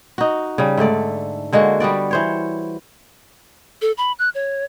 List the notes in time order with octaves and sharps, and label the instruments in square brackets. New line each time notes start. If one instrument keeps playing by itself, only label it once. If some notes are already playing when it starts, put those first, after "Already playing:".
[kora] D#4 F#4
C#3 G3
G#2 D3 A3 D5
D3 G#3 A#3 F#4
G3 B3 F#4 D5
E3 C5 C#5
[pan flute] A4
B5
F#6
C#5